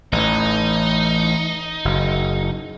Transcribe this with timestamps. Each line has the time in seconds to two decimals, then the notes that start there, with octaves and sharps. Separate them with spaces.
0.12 A1 E3 D#4
1.85 F#1